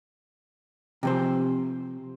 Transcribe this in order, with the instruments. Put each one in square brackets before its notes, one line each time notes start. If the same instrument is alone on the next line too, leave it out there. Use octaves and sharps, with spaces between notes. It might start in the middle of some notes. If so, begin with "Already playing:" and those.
[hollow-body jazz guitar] C3 F3 C5